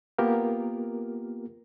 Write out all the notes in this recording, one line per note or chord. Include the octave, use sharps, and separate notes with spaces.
A#3 B3 F4 G4 A#4